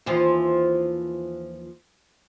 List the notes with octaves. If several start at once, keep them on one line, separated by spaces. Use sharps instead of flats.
D#2 E3 F3